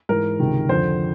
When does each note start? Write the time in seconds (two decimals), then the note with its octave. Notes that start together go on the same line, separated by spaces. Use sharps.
0.09 G#2 E3 A#4
0.40 C#2 C3 D#3
0.69 F2 D3 F3 C5